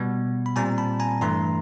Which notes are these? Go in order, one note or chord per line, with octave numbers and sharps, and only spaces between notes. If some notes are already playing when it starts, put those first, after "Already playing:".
Already playing: B2 G3 B3
B5
A#2 G3 C4 G#5 A#5
A5 B5
G#5 A#5
G2 E3 A3 A#5 C6